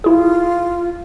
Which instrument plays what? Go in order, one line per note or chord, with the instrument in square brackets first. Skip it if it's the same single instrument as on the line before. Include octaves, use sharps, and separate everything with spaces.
[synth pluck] E4 G#4 [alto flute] F4